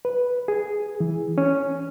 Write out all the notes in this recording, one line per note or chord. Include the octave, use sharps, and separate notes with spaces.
B4
G#4
E3
C#4